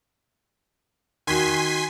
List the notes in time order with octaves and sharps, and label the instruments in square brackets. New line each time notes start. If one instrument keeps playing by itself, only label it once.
[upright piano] D#3 F#4 [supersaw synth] G#5 C6 B6